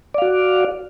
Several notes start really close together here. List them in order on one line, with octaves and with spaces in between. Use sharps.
D5 F5 F#4